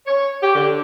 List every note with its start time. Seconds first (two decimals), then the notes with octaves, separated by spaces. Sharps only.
0.07 C#5
0.43 G4
0.55 D3